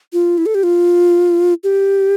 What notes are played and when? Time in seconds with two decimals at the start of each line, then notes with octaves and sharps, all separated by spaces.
0.13 F4
0.38 E4
0.46 A4
0.55 G4
0.63 F4
1.64 G4